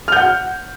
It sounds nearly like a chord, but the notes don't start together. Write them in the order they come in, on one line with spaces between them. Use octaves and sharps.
F6 G6 F#5